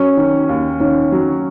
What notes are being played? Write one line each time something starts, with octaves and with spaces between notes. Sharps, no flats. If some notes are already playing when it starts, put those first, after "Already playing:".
Already playing: F#3 C#4
D#3
D#2
D#3 C#4
F#3